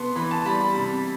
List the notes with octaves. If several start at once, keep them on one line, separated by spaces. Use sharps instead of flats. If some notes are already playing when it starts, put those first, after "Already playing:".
Already playing: C3 B3 A5 C6
E3 B5
A5
G3 B5
B5
C3 B5